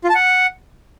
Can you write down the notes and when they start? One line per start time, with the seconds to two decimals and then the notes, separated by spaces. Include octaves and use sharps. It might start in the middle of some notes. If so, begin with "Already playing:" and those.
0.04 F4
0.09 A5
0.15 F#5